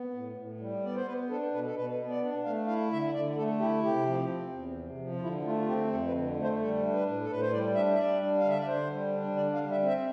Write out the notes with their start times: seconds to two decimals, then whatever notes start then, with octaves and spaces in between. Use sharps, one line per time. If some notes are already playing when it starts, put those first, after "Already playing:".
Already playing: B3
0.14 A2
0.37 A2
0.60 G3
0.83 B3 D5
0.96 C5
1.06 B3 B4
1.29 D4 A4
1.52 B2 B4
1.64 A4
1.75 B2 B4
1.99 B3
2.10 D5
2.21 D4
2.44 A3 F5
2.67 E4 F5
2.91 D3 E5
3.14 D3 D5
3.36 A3 A4
3.59 E4 G4
3.83 C3 G4
4.06 F3
4.29 C4
4.52 E2
4.75 C3
4.98 F3
5.16 F4
5.21 D3 E4
5.44 A3 F4
5.57 F4
5.67 C4 G4
5.91 F2 A4
6.07 B4
6.14 D3
6.37 A3
6.43 C5
6.59 G3 A4
6.82 D4
6.94 B4
7.06 A2
7.21 A4
7.29 A2 B4
7.41 C5
7.52 G3 D5
7.75 D4 E5
7.94 E5
7.97 G3 D5
8.21 D4
8.38 F5
8.44 D3 E5
8.57 D5
8.67 D3 C5
8.90 G3
9.13 D4
9.36 D3 D5
9.54 F5
9.59 G3
9.71 E5
9.82 C4
9.88 E5